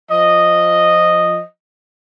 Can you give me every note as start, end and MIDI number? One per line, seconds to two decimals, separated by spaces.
0.11 1.43 53
0.11 1.43 75